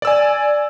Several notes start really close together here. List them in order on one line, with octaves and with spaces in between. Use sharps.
D5 E6 G#5